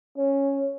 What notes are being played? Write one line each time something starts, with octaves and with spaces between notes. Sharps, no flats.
C#4